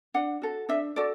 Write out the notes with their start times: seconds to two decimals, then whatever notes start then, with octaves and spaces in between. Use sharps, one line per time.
0.14 D4 F#5
0.42 F#4 A4
0.69 D4 E5
0.96 F#4 A4 D5